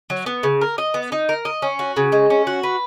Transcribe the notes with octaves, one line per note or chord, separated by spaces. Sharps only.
F#3
B3
C#3
A#4
D#5
B3
D#4
A#4
D#5
C#4
F#4
C#3
G#3
C#4
F#4
B4